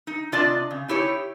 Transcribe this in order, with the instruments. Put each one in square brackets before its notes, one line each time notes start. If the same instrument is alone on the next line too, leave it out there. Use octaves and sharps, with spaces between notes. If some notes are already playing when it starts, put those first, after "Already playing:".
[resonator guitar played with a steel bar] D#4
C3 D4 F4 D5 D#5 A5
C#3
D#4 E4 G4 C#5